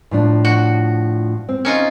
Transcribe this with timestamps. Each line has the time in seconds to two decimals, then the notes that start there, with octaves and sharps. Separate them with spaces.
0.11 A2 F3 D4
0.45 F#4
1.49 C4
1.65 C#4 D#4 F4